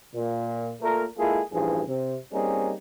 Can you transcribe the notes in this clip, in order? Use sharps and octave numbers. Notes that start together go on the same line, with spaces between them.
A#2
A#2 A3 A#4
G#3 A#3 E4 F4 G#4 A4
A1 G2 E3 F3 G#4
C3
G3 A#3 C4 C#4 D#4 G#4